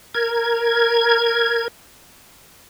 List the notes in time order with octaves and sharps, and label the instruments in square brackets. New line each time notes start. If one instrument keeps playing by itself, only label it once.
[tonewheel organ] A#4 G#6